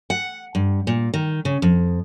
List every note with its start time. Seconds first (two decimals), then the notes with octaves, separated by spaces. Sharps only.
0.10 F#5
0.55 G2
0.87 A#2
1.14 D#3
1.45 C#3
1.62 F2